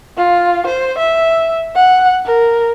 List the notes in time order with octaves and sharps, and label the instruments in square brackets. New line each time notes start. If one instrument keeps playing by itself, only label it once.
[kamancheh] F4
C5
E5
F#5
A#4